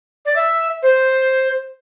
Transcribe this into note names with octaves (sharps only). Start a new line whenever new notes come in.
D5
E5
C5